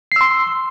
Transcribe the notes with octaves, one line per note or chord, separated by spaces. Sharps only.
C6 E6 C7